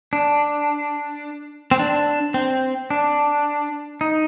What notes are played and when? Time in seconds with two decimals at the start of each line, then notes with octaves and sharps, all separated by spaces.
0.13 D4
1.71 C4
1.80 D4
2.34 C4
2.90 D4
4.01 D#4